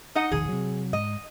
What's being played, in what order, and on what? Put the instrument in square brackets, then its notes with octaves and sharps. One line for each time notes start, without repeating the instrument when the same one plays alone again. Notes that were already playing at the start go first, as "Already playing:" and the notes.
[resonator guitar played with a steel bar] D#4 D#5 F#5
[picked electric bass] E1 A#1 D#3 [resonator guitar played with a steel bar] G#4
[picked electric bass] C3 F#3
[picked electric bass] G#2 [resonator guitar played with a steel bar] D#5